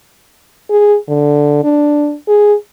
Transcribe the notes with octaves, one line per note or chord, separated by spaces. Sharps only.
G#4
D3
D4
G#4